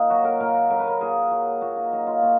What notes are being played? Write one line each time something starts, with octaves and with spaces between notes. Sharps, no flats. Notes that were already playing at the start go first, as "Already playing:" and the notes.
Already playing: A#2 D#4
F#3 F#4
A#4
A#2 A#4
F#3 A#4
B4
A#4
A#2 G#4
F#3
A#2 F#4
D#4
F#3 D#4
F4
A#2 F#4